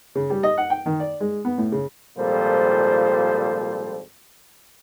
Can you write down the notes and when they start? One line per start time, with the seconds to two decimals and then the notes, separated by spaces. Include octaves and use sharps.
0.15 C#3
0.30 G3
0.43 D#5
0.58 F#5
0.70 G5
0.86 D#3
1.00 D5
1.20 G#3
1.45 B3
1.58 A2
1.72 C#3
2.17 G#1 A#2 F3 G3 A4 C5